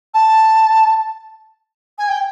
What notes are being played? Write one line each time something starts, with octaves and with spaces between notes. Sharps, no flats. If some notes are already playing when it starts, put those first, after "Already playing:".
A5
G#5
G5